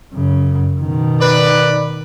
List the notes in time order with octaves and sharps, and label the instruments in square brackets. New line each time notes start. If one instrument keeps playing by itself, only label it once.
[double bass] F#2 C#3
B2 D#3
[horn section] B4 D5